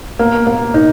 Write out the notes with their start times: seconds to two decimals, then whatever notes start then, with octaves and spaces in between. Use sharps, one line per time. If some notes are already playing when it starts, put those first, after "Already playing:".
0.19 A#3
0.47 A#3
0.74 D#4